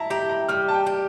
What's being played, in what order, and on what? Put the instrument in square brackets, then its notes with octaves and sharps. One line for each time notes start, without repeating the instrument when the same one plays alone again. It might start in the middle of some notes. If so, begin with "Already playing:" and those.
Already playing: [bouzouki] E4 [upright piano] A5 A#5
[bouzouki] G4 [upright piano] A#5
[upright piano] A#5
[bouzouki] G3 [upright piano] F6
[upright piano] A5
G5
[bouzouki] G4